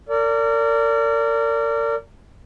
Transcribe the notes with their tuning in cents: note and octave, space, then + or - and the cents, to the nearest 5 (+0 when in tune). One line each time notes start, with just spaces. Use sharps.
A#4 -35 D5 -25